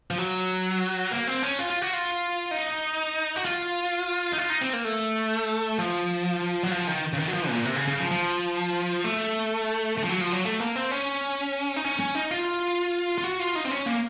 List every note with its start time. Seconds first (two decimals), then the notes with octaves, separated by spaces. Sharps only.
0.11 F3
0.18 F#3
1.11 A#3
1.27 C4
1.43 C#4
1.59 F4
1.70 F4
1.82 F#4
1.93 F4
2.51 D#4
3.36 F#4
3.45 F4
4.33 D#4
4.38 F4
4.50 D#4
4.61 C4
4.73 A#3
4.85 A3
5.78 F3
6.63 F#3
6.71 F3
6.87 D#3
7.13 C#3
7.18 D#3
7.28 F#3
7.34 F3
7.49 A#2
7.65 C3
7.76 C#3
7.88 C#3
8.00 F3
8.12 F3
9.04 A3
9.98 A3
10.04 F3
10.09 F#3
10.21 F3
10.33 F#3
10.45 A3
10.60 A#3
10.76 C4
10.91 C#4
11.76 D#4
11.85 C#4
12.00 C#4
12.15 D#4
12.31 F4
13.18 F4
13.24 F#4
13.40 F4
13.56 D#4
13.65 C4
13.71 C#4
13.86 A#3